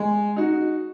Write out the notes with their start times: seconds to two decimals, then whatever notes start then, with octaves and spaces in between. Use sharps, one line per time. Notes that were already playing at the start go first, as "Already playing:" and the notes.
Already playing: G#3
0.36 D#4 F#4